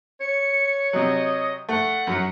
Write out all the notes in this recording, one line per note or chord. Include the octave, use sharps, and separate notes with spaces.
C#5 C#7
C3 F#3 D#5
A3 F#5
F#2 F#3